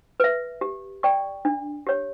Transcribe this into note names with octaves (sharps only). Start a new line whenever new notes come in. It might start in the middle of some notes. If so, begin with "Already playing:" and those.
B4 E5
G4
D5 G5 C#6
D4
G4 C#5